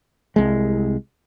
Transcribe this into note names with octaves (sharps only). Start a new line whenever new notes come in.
C2 G#3